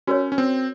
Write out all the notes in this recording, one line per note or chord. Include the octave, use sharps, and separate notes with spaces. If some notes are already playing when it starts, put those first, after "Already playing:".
C#4 F#4 A#4 C#5
C#4
C4